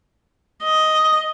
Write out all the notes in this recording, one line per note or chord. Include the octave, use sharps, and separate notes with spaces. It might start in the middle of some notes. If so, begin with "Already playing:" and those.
D#5